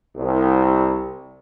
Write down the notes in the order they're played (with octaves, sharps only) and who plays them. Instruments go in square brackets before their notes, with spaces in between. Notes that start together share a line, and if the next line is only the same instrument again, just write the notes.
[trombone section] C2